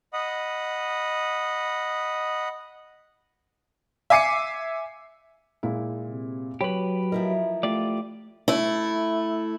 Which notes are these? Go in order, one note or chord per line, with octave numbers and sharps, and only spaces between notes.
D#5 F#5 B5 D#6
E5 G#5 D6 C7 C#7 D#7
A#2 G#3 E4
C3
F#3 G4 B4 C#5 B5
F3 E4 A#4 D#5
A3 F4 G4 D5
A3 E4